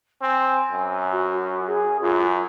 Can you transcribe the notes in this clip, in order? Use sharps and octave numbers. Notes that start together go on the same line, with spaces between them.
C4 G#5
F#2
F#4
G#4
F#2 F4